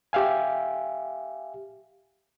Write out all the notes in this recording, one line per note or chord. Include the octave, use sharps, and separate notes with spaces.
G4 E5 F5 G#5